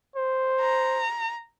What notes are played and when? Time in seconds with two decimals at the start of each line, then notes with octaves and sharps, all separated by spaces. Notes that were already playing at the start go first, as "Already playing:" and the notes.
0.16 C5
0.61 A#5